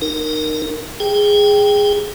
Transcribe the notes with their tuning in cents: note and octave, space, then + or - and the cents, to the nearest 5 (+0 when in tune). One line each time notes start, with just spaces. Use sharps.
D#4 -25 A#4 +0
G#4 -10 G5 +5